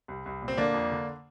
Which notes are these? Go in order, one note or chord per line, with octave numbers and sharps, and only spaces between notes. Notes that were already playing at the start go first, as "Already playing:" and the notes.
C2
C2
A#2
C4
D3 A#3 D4
F2
D3